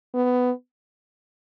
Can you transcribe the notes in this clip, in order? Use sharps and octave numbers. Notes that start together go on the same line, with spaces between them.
B3